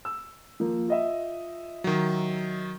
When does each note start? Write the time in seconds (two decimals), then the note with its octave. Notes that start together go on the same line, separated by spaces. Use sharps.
0.05 E6
0.60 F3 A#3
0.88 F4 D#5 E5
1.84 D#3 F#3